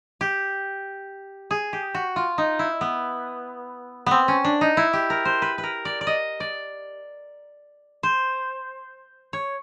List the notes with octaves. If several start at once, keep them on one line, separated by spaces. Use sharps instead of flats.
G4
G#4
G4
F#4
F4
D#4
E4
B3
B3 C4
C#4
D4
D#4
E4
G4
A#4
C5
B4
B4
A#4
D5
D5
D#5
D5
C5
C#5